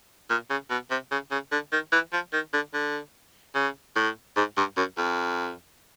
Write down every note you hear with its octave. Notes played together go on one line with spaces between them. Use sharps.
A#2
C#3
B2
C3
C#3
C#3
D3
D#3
E3
F3
D#3
D3
D3
C#3
A2
G#2
G2
F#2
F2